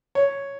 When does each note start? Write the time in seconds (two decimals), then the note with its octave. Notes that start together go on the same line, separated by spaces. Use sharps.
0.15 C#5